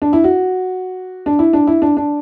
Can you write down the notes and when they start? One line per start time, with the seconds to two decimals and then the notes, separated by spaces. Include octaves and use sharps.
0.02 D4
0.13 E4
0.24 F#4
1.26 D4
1.39 E4
1.53 D4
1.67 E4
1.82 D4
1.97 D4